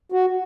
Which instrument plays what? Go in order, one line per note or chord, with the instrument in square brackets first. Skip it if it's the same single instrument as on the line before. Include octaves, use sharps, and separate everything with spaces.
[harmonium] F#4